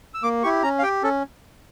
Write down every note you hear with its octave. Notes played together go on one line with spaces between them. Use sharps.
E6
A#3 D6
E4 G4 C#6
C#4 A#5
F5
G4 G5
C#4 A4